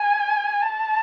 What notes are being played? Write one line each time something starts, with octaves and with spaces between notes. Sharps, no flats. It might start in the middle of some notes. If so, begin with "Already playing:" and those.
Already playing: G#5
A5